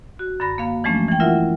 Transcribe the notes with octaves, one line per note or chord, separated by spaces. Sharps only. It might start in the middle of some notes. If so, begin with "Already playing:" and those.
F#4
F#2 D3 B5 A#6
A#3 F5
E3 F3 G#3 A3 C#4 D4
E3 G5
E4 F4 A#4 E5 F#5